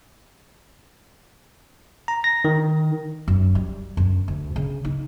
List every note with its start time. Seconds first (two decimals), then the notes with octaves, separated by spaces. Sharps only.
2.08 A#5
2.24 A#6
2.45 D#3
3.28 F#2
3.55 G3
3.97 F#2
4.28 D2
4.56 C#3
4.85 D#4